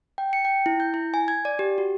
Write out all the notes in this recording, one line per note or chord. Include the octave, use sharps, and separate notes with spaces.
G5
C#7
G5
E4
G6
E4
G#5
G#6
D5
G4
F#4